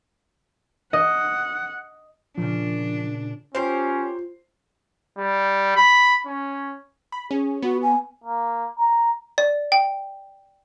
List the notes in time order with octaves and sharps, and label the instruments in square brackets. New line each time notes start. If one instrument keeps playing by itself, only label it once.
[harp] D#5 [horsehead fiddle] F#5
[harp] A#2 C#3 [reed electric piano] F3 [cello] D4
[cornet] C#4 [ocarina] F4 [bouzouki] G4 A#4 [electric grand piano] C5 C6 C7
[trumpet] G3
B5
C#4
[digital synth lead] B5
[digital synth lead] C#4 [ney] G#4
[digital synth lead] B3 [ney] F#4
[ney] G#5
[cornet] A#3
A#5
[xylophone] D5
G5